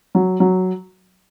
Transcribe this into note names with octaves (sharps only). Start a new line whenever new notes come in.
F#3
F#3